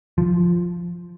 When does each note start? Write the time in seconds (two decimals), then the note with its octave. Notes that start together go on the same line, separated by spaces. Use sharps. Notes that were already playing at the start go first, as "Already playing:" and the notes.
0.18 F3